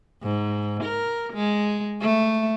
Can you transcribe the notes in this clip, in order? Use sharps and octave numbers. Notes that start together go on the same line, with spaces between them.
G#2
A#4
G#3
A3